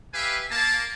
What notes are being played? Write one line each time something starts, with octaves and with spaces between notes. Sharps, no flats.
G4 B4 E5 F5 G#5
A#3 A5